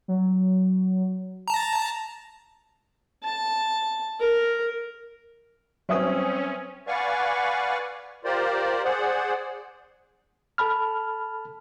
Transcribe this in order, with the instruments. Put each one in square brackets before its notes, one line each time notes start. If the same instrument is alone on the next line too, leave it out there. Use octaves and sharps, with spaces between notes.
[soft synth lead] F#3
[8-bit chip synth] A5 A#5
[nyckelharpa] A5
A#4
[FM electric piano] F#3 G3 B4 [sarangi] C4 [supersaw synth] C#4 [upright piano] C#5 E5 D#6
[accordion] B4 D5 F5 F#5 G#5 C#6
F4 G4 A#4 C5 D5
G#4 C5 D5 F#5
[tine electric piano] A4 A5 B5 F6